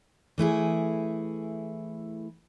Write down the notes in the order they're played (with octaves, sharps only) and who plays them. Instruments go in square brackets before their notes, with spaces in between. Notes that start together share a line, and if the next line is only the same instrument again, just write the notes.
[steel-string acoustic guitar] E3 A3 E4 G#4